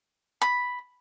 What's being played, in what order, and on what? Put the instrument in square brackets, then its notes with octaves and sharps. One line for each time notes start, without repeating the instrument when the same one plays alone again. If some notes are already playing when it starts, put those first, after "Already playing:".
[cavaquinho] B5